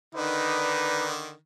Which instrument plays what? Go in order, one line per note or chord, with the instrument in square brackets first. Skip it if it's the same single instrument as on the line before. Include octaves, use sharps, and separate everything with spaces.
[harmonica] D3 D#3 [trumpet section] D#4 B4 D5